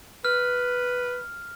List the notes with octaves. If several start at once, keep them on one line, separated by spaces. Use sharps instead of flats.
B4 F6